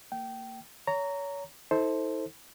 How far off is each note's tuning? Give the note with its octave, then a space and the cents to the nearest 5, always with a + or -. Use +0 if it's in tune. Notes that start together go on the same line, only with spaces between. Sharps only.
A#3 -25 G5 -20
C#5 +30 A#5 -10
E4 -45 A4 +0 C5 +0